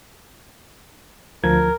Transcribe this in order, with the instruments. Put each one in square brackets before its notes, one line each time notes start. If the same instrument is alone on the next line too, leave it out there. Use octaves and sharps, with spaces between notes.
[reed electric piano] D2 F3 G#6 [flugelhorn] A#4